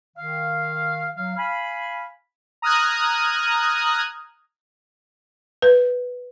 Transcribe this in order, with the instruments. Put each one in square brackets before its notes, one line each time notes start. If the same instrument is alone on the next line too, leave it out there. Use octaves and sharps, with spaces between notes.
[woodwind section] D#3 F5
F#3 F5
F5 G#5 B5
[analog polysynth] A#5 D#6 F6 F#6 G#6
[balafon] B4